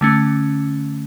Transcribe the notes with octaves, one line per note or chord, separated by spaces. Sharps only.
D3 A3 C#4